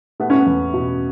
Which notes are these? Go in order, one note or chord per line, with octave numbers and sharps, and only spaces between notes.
A3 B3
C#4
B3
E2
B2